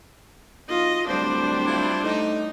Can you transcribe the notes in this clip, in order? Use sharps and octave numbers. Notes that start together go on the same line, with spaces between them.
B1 F4 D#5
D1 G3 D4 C5
E4 F4
A2 D#4